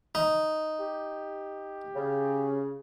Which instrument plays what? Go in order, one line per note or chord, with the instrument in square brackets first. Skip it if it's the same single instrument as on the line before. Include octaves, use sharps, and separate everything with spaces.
[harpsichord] D#4
[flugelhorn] G4
[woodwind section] C#3